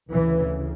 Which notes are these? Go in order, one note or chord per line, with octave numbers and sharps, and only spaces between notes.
D2 C#3 E3